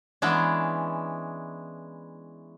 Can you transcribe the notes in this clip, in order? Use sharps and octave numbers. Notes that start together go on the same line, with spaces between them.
E3 G#3 B3 C#4 D4